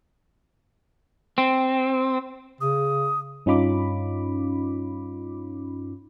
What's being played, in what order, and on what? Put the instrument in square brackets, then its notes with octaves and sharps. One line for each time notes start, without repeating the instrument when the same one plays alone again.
[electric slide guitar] C4
[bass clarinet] C#3 [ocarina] D#6
[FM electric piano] G2 C#4 D#4 F4 B5 D6